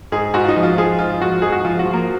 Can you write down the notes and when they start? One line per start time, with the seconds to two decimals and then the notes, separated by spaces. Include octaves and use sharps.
0.12 G#2 G#4
0.34 G#2 F#4
0.44 F4
0.48 D#4
0.56 F3
0.63 F4
0.78 F3 G#4
0.99 G#2 F4
1.21 F3 F#4
1.42 G#2 G#4
1.52 F#4
1.65 F3 F4
1.79 F#4
1.86 F3
1.93 A#3